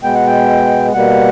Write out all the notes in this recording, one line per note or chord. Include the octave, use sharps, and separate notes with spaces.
B2 G#3 B3 G5
F#5
G5
B2 G3 A#3 F#5